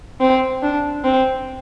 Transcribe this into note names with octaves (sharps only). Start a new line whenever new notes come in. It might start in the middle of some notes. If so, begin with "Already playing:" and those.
C4
D4
C4